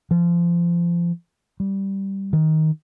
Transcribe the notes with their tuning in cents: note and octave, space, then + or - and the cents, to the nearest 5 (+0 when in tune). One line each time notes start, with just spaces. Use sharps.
F3 -25
G3 -5
D#3 +10